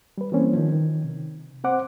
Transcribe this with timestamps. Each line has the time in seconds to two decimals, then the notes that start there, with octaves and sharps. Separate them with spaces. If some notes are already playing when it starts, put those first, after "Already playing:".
0.18 G3 B4
0.32 E3 G3 A#3 C4 C#4
0.53 D#3 F3
0.72 D#3
1.04 C3
1.64 C4 C5 F#5 D6